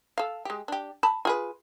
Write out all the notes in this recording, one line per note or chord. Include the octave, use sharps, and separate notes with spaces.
A4 F5
G#3 G4
D4 G4
A5 B5
F4 G#4 B4